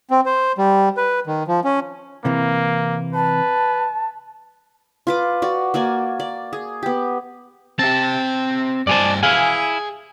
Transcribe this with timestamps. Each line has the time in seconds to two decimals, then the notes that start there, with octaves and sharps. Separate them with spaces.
0.11 C4
0.26 C5
0.58 G3
0.97 B4
1.27 D#3
1.48 F3
1.64 C#4
2.25 C3 E3 A#3
3.14 B4 A5
5.07 F4 B4 D6
5.42 F#4 D5
5.74 A#3 F#4 D5 G#5
6.20 D5
6.53 G#4
6.83 B3 G4
7.79 C4 G4 A5
8.87 G2 C5 D5 G#5 A5
9.23 E4 G#4 F5 G#5